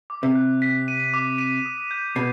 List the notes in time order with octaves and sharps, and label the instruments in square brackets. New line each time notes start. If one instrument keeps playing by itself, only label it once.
[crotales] D6
[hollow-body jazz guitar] C3
[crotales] F#6
B6
D#7
D6
D#7
D#6
G6
[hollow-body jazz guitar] B2 [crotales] C7